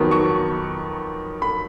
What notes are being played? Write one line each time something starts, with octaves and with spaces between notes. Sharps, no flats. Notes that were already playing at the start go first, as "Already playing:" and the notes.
Already playing: F2 D#3 F#3 B3
C#6
B5